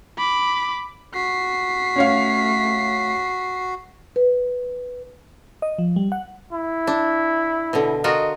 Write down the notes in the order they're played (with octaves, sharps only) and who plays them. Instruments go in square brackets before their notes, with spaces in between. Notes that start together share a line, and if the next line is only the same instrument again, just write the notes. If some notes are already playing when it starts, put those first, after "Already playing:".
[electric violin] B5 D6
[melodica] F#4 [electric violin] B6 C7
[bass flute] A3 [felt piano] C#4 C#5 F5
[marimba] B4
[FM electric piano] D#5
F3
G3
F#5
[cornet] E4
[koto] D4
B2 D3
[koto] F4 F#4 A#4 [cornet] D#5